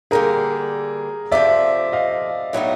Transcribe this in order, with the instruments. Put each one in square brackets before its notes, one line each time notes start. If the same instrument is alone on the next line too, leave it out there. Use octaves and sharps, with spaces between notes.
[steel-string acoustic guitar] D3 G3 A#3 [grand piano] G#4 A#4
[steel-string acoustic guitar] F2 C3 F3 [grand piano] D5 E5
[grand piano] D#5 F5
[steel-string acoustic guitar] A2 F#3 B3 D#4